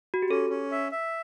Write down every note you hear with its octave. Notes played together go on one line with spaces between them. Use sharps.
F#4
G4
C#4 A4
C#4
E5
E5